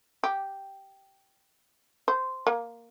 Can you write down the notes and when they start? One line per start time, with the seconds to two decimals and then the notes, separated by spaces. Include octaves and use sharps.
0.24 G4
2.08 C5
2.47 A#3